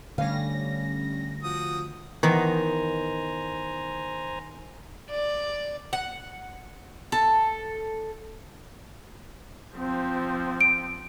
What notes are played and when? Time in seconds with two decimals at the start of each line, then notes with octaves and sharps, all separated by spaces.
0.18 D3 G3 A3 C#4 F5 A#6
1.43 F3 F#4 D#6
2.23 D#3 E3 B3 B4 C5 G#5 A#5
5.10 D5
5.93 F#5
7.12 A4
9.76 F3 C4
10.61 D7